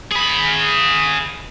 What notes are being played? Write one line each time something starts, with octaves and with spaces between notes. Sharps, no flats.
G#4 B5